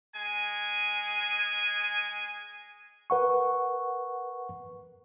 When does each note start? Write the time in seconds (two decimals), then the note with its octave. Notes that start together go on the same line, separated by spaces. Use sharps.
0.15 G#3 G#5
3.10 A#4 B4 F#5 C#6